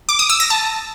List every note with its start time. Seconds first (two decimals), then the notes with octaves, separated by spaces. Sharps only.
0.09 D6
0.19 D#6
0.29 E6
0.40 A#6
0.50 A5